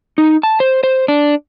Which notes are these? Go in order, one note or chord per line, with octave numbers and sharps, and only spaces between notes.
D#4
A5
C5
C5
D4